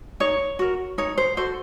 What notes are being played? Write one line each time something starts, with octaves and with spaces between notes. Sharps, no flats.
D#4 C#5
F#4 A#4
D#4 C#5
C5
F#4 A4 C5